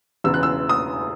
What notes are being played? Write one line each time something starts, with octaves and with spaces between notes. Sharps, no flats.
E1 E2 C#3 E6
F#6
E6
D#6